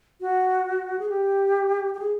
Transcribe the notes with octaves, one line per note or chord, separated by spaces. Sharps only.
F#4
G#4
G4
G4
G#4